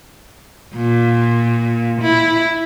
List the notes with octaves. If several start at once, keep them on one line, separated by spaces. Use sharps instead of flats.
A#2
E4